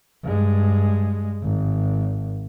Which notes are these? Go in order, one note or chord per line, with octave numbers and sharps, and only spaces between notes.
G2 G#3
G#1